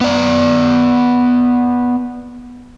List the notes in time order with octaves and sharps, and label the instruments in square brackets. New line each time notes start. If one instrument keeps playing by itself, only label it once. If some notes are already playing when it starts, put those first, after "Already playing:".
[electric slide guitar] B3 D5